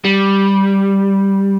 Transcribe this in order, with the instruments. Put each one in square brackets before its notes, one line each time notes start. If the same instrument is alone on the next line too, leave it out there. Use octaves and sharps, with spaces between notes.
[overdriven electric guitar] G3